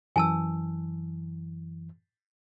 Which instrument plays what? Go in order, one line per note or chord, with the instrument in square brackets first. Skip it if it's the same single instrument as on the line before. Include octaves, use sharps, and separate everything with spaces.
[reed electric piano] F#2 E3 [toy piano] G#5 A5 E6